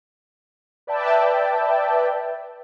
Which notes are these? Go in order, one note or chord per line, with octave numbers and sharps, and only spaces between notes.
B4 D5 E5 G5 A5